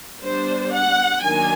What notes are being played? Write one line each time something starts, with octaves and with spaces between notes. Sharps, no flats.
G3 B3 D4 C5
F#5
D#3 F#3 A#3 D4 G#5